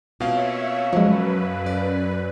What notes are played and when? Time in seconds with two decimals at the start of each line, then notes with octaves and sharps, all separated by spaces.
0.20 B2 A#3 C4 F4 C#5 E5 F5
0.93 F#2 F3 F#3 G#3 B4
1.66 D5